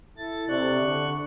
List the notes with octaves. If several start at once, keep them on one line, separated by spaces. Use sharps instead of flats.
E4 A4 A6
C3 D4 C#6 F#6
D3